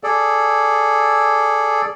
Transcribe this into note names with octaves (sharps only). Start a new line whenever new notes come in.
G#4 A4 D5